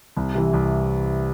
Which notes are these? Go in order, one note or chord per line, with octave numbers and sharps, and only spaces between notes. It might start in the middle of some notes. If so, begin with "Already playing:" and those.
C2
C3 E3
C2